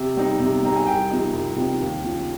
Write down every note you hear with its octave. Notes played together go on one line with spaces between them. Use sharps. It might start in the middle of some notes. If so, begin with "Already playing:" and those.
Already playing: C3
G3 C4 D#4
C3
G3 C4 D#4 A#5
G#5
C2 G5
C3 F3 C4 D#4
C2
C3 F3 C4 D#4
D#2
C#3 F3